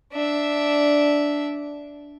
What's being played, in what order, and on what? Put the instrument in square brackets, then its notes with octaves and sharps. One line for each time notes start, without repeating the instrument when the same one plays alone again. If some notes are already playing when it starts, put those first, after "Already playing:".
[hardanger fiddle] D4 E5